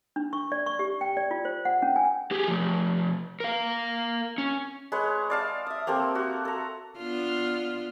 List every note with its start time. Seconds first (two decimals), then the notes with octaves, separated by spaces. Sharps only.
0.16 D4
0.33 C#6
0.52 D5
0.66 C#6
0.79 G4
1.01 G5
1.17 D5
1.31 F4
1.45 C5
1.65 F#5
1.82 C#4
1.96 G#5
2.31 G4 G#4
2.48 F3 A3
3.40 A#4 F5
4.38 C#4
4.92 G#3 B4 C#5 F#5
5.30 D5 F5 A5
5.66 E5 D#6
5.87 A#3 C4 G4 A4
6.15 F#4
6.45 A4 A#5
6.98 B3 D4 F4